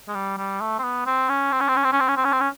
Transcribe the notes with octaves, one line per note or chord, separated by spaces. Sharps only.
G#3
G3
G3
A3
C4
B3
C4
C#4
C4
C#4
C4
C#4
C4
C#4
C4
C#4
C4
C#4
C4
C#4